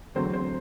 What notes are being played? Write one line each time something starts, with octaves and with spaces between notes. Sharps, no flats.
E2 D3 F#3 A3 C4 C5
C5